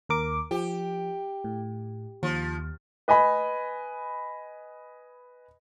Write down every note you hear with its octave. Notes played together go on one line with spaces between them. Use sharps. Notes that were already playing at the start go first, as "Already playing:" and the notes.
D#2 A#4 D6
F3 G4
A2
D#2 F3
B4 D#5 G#5 B5